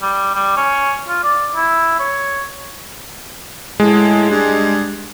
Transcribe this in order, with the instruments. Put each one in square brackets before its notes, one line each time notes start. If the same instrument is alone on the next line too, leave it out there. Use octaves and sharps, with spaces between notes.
[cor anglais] G3
G3
C#4
F4
D5
E4
C#5
[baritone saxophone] A2 [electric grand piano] G#3
[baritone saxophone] G2